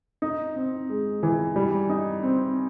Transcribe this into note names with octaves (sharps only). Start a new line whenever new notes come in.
D#4
C4
G#3
E3
G3
D#4
C4